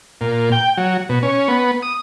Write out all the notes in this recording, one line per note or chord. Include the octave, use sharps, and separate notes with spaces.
A#2
G5
F#3
B2
C#4
B3
D#6